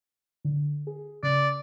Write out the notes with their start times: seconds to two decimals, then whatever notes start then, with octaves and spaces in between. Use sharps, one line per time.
0.45 D3
0.87 G#4
1.23 C#3 D5